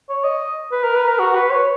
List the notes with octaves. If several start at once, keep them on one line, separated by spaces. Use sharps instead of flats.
C#5
D#5
B4
A#4
B4
A#4
F#4
B4
C#5